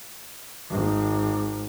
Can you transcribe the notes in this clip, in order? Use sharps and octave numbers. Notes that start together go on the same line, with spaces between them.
G#1